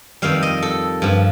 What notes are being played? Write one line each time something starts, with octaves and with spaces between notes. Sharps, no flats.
F2 D#3 G3 F5
D#5
A4
G2 F3